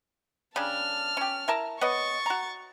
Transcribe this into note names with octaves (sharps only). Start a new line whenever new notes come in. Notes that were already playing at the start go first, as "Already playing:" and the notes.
C#3 G3 D4 A5 F6
C#4 G4
E4 A#4 A5
B3 C#5 D#5 C#6 A6
F#4 A#5